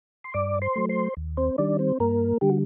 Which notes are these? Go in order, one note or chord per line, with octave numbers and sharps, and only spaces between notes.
C6
G2 D5 D6
C5 C6
F#3 A3
C5 C6
D#2
C4 C5
D#3 G3 D4 D5
C4 C5
G2 A#3 A#4
D3 G3 G4
F#4